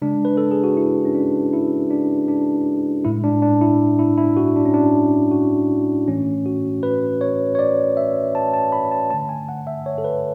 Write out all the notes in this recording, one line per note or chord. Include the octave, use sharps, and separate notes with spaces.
C#3 G#3 D4
B4
A4
G#4
F#4
E4
C#4
D4
E4
D4
D4
A2 G#3 E4
D4
D4
E4
E4
E4
F#4
D4
C#4
D4
F#4
A2 E3 A3 C#4
F#4
B4
C#5
C#5
D5
E5
A5
A5
B5
A5
D3 A3 A5
G#5
F#5
E5
C#5
A4
B4